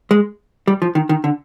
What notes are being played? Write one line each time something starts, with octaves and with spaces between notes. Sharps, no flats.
G#3
G3
F3
D#3
D#3
D3